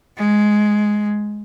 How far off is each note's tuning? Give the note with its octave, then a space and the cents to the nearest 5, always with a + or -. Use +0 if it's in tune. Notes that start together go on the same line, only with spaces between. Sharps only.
G#3 +10